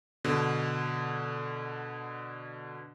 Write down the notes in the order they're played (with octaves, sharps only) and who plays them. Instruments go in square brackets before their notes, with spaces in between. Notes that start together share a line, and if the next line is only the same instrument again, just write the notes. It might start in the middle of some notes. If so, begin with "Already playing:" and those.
[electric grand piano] B2 D3